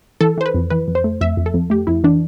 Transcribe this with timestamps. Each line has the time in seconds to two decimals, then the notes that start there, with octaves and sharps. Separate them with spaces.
0.21 E3 A4
0.38 E3 C5
0.46 B4
0.54 F2
0.70 E3 B4
0.88 F2
0.95 C5
1.04 A3
1.21 F2 E5
1.37 F2
1.46 A4
1.54 F2
1.70 A3 G4
1.87 F2 E4
2.04 E3 D4